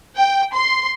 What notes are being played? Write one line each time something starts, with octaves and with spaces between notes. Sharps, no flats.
G5
C6